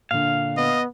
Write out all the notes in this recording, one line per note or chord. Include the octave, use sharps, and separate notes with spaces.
A#2 D3 F5
B3 D#5